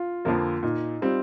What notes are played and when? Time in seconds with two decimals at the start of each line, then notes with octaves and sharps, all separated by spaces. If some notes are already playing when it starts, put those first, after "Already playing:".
Already playing: F4
0.25 F2 D3 F3 A#3
0.63 A#2 D#4
1.01 G3 C4 F4